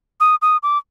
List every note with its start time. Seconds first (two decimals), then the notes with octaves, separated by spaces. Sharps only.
0.20 D#6
0.42 D#6
0.63 D6